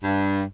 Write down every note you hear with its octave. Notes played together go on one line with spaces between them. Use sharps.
G2